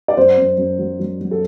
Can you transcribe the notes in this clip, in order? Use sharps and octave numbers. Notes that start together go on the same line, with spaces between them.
D5
F#2 C5
F#2
F#2
F#3
F#3
F#3
A4